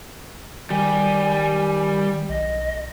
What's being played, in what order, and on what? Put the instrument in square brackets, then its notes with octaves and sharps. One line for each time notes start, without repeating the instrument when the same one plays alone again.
[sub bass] D#3 [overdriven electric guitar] G3 G4 [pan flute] G#5
[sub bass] B1 [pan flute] D#5